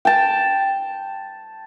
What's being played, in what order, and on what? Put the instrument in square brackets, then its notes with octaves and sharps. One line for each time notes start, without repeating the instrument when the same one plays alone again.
[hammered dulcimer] G5 A5